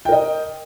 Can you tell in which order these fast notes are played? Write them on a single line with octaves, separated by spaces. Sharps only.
G5 A#4 D#5